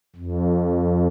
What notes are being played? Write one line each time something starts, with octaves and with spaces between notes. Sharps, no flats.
F2